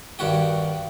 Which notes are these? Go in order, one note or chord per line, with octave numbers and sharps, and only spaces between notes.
G2 D#3 F#4 G4